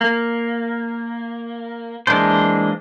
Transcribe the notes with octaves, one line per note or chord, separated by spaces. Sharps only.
A#3
E3 G#3 A#3 D4 C5